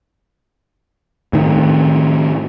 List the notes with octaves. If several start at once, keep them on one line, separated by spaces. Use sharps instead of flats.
A2 D#3